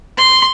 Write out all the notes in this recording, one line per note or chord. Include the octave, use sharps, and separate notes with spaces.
C6